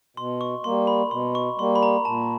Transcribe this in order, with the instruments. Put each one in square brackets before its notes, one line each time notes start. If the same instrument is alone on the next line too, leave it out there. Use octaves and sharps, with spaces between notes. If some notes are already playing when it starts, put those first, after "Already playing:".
[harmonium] B2 [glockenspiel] C6
[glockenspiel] C#6
[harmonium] G3 A#3 [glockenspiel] C6
[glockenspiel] B5
[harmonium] B2 [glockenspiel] C6
[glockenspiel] C#6
[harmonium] G3 A#3 [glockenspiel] C6
[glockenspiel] B5
A#5
[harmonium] A#2 [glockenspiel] A5